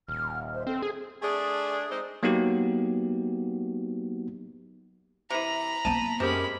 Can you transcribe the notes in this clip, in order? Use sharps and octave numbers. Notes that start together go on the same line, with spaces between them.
D#1 F6
C5 E5
C4 A4
G#4
A3 D4 G#4
G#3 C4 D#4 C5 D#5
F#3 A#3 B3 D#4 F#4 G4
C3 E3 A#5 B5
A#3 B3 G5 A5 D#7
F#2 G#3 C4 G4 A#4 B5